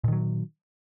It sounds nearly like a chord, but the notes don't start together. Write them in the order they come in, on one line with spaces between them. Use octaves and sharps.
A#2 D#3 F#3